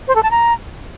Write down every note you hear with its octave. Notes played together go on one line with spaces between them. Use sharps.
C5
A4
A5
A#5